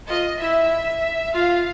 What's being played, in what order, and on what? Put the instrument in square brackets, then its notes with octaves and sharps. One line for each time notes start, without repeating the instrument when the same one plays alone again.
[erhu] F4 [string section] D#5
[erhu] E4 [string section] E5
[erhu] F4 [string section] F5